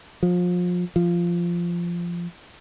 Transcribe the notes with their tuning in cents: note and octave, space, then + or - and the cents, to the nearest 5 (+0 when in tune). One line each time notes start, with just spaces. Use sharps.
F3 +30
F3 -10